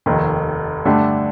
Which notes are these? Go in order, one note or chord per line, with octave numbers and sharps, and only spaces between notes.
F1 D#2 D#3
G2 D3 A3 D4 G4